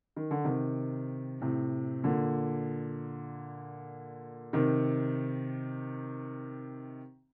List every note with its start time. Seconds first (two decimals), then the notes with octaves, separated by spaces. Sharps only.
0.17 D#3
0.31 D3
0.44 C3 D#3
1.41 A2 C3
2.04 A#2 D3
4.53 C3 D#3